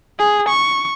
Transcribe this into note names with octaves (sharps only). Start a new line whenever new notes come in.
G#4
C#6